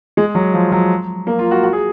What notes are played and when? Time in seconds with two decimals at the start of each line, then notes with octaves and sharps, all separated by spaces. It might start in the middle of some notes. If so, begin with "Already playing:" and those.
0.17 G#3
0.35 F#3
0.54 F3
0.72 F#3
1.27 A#3
1.39 F4
1.51 F#4
1.64 F#4
1.73 G#4